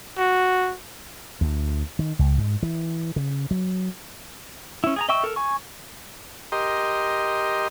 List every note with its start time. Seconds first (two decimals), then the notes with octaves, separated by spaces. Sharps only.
0.18 F#4
1.41 D2
1.99 D#3
2.19 C#2
2.38 G#2
2.63 E3
3.16 C#3
3.51 F#3
4.84 C#4 E4
4.96 G#4 G#5 A#5
5.09 D#5 E5 G5 C#6 E6
5.24 A4 A#4
5.36 G#5 C#6
6.52 G4 A#4 D#5 C6